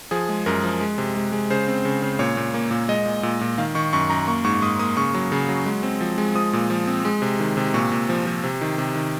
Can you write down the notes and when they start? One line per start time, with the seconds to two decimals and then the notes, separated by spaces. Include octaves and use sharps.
0.11 F3 G#4
0.29 G#3
0.46 F#2 A#4
0.64 F3
0.81 G#3
0.98 C3
1.15 G#3
1.32 G#3
1.50 C#3 C5
1.68 C4
1.85 C#3
2.02 C#3
2.19 A#2 C#5
2.37 A#2
2.54 A#3
2.71 A#2
2.88 G#3 D#5
3.06 A#2
3.23 A#2
3.41 A#2
3.58 D#3 F5
3.75 D#3 C#6
3.93 F#2 C#6
4.10 F#2 A#5
4.27 A#3 C#6
4.45 G#2 C#6
4.62 G#2 D#6
4.79 A#3 D#6
4.97 C#3 C#6
5.14 F#3
5.32 C#3
5.49 F#3
5.66 G#3
5.83 C4
6.01 F3
6.18 G#3
6.35 F3 D#6
6.53 A#2
6.70 F3
6.87 C4
7.05 G#3
7.22 C3
7.40 D#3
7.57 C3
7.74 A#2 C#6
7.92 A#2
8.09 F3
8.26 F3
8.44 C3
8.61 D#3
8.78 C3
8.96 D#3